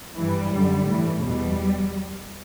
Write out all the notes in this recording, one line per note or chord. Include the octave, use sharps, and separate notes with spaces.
G2 E3 G3
F#2 D3
A2 E3
E2 B2 G3